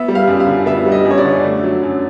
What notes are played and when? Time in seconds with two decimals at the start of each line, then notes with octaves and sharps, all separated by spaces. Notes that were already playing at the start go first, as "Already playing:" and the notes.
Already playing: B3 E5
0.08 G3
0.15 F5
0.28 F#2
0.40 F5
0.47 D3
0.66 B3 E5
0.86 G3
0.92 D#5
1.05 F#2
1.11 C#5
1.18 D5
1.25 D3
1.43 A3
1.64 F#3
1.83 F#2